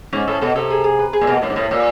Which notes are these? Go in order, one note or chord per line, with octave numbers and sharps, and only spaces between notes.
G#2 C#4
A2 A4
B2 A4
C3 A4
G#4
G#4
B4
G#4
A#2
B2 A#3
A2 A#3
G#2
A2 A#3
A#2 A#3